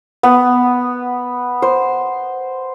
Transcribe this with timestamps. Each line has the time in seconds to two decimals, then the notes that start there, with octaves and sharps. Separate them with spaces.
0.23 B3
1.62 C5